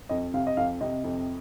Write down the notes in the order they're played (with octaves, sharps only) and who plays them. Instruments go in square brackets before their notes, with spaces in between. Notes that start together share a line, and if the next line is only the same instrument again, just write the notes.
[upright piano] F2 D#5
C3 F5
D#5
F2 F5
C3 D#5
F2